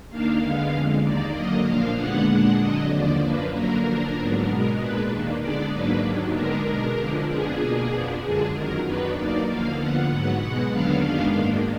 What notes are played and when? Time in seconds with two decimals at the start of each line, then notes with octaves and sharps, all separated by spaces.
0.09 D#2 D#3 A#3 D4 F5
0.41 D3 G#3 B3
0.72 F2 D3 G#3
1.04 D#2 D#3 A#3 D5
1.34 D3 F#3 A#3 D#5
1.65 A#2 F3 A#3 D4 F5
1.97 D#2 D3 G#3 B3 D4 F#5
2.28 A#2 G#3 D4 F#5
2.59 F2 D3 F#3 D4 D#5
2.90 D#2 D3 F3 D5
3.21 F#2 F3 A#3 D4 B4
3.53 D3 F#3 A#3 A#4
3.85 D3 F3 A#3 D4
4.15 G#2 F#3 B3 D4
4.47 B2 G#3 B3 A#4
4.78 A#2 G#3 D4 B4
5.09 D#2 D#3 A#3 D4
5.40 D3 G#3 B3 D4 D5
5.72 G#2 F#3 A#3 D4 B4
6.03 D#2 D#3 F#3 D4
6.34 D3 G#3 B3 D4 A#4
6.66 B2 G#3 D4
6.97 F2 D3 F3 G#3 D4
7.27 F2 F3 B3 D4 G#4
7.59 B2 A#3 D4
7.90 F2 F3 B3 D4
8.21 F#2 D3 G#3 D4 G#4
8.53 F2 D#3 F#3 A#4
8.84 F#2 D#3 F#3 B3 D4 B4
9.15 D#2 D#3 F#3 A#3 D5
9.46 D#2 D3 F3 A#3 F5
9.78 D3 F3 B3 F#5
10.09 G#2 F#3 B3 F#5
10.40 B2 G#3 B3 F#5
10.71 D#2 D3 F#3 B3 D4 F5
11.03 F#2 D#3 G#3 B3 D4 F5
11.34 G#2 D#3 A#3 D4